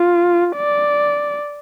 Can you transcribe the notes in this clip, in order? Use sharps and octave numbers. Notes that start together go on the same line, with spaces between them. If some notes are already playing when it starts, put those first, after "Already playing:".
Already playing: F4
D5